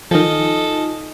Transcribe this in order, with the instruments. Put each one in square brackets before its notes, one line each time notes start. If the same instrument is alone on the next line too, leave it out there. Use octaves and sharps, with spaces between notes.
[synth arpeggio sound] D#3 F3 [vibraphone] D#4 F4 G#5 [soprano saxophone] A4 [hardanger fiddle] D#5